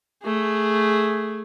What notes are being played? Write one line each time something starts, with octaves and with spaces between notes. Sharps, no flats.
A3 G#4